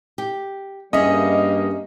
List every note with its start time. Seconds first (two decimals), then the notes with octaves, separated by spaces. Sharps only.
0.18 G4
0.93 G2 G3 A#3 C#4 G#4 D#5 E5